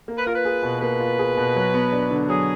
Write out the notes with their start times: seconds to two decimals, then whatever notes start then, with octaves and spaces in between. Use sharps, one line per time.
0.08 A#3
0.17 B4
0.27 F4 A#4
0.35 B4
0.45 G#4
0.63 B2
0.81 A#3 B4
1.00 F4
1.19 G#4
1.37 B2
1.56 F#3
1.74 B3
1.92 D4
2.11 D3
2.29 F#3 G#4